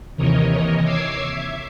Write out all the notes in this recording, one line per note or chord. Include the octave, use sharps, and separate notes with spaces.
D#2 C3 E3 A#4 C#5 D#5
C#5 D6 E6 G#6 C7
E5